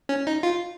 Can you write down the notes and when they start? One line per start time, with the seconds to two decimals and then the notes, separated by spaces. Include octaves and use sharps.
0.09 C#4
0.27 D#4
0.43 F4